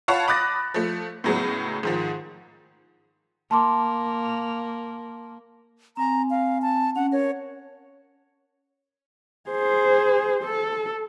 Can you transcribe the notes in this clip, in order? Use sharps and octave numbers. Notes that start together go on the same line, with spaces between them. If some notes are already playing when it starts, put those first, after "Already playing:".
F4 C#5 F5 F#5 A5 B5
B5 D6 D#6 F#6 A6 A#6
F3 A3
A2 C#3 F#3 G#3 B3
G#2 D#3 F3
A#3 A5 C6 D6
C4 G#5 A#5
F5
A5
C#4 F#5
A#4 C#5
G#4 C5
A4